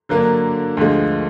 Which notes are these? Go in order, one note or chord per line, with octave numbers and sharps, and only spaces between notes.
D3 F#3 A#3 D4
D2 D3 F3 G#3